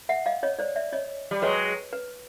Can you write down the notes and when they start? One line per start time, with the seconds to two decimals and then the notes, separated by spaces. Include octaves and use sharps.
0.09 E5 F#5
0.26 D#5 F5
0.43 C#5 D#5
0.59 C5 D5
0.76 D5 E5
0.92 C#5 D#5
1.31 G3
1.42 F#3 G#3 B4 C#5
1.93 B4